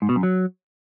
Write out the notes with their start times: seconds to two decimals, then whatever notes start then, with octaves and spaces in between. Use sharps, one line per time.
0.02 G#2
0.09 B2
0.16 F#2
0.23 F#3